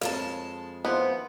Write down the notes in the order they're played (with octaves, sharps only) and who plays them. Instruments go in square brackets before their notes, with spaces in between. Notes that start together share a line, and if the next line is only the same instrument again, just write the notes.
[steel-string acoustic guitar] F2 G#3 A5 [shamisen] A#4 C#5 F5
[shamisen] D#3 E4 F4 [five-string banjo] B3 [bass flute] C5